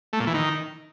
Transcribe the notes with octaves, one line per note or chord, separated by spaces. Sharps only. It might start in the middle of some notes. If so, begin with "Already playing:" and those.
A3
A#2
E3
D#3